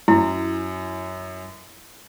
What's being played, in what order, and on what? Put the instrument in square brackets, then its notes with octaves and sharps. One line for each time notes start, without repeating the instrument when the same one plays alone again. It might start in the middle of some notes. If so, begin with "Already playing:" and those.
[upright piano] F#2 [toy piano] E4